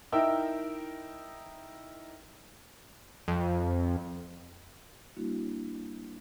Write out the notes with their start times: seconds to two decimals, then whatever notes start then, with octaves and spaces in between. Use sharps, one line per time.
0.12 D#4 E4 A#4 G5 E6
3.28 F2
5.17 G3 A#3 D4 E4 F#4